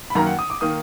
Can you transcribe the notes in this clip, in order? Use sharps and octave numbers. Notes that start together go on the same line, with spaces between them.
B5
F#2 D#3 A#3 A#5
F#5
D#6
D6
D#3 A#3 D#6